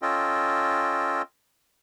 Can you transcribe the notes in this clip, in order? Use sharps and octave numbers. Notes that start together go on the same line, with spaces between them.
C#4 F4 A4 D#5 G5